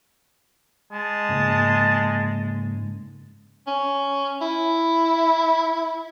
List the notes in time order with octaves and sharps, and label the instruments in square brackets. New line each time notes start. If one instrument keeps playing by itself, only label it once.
[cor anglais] G#3 [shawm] A5
[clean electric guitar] G#2 C#3 A#3
[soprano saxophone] C#4
E4